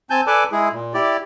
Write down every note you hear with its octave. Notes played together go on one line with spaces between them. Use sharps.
C4 G#5 A5 G6
A4 B4 D5 G#5 A5 D6
G#3 E4 G#4
A#2
E4 G4 D5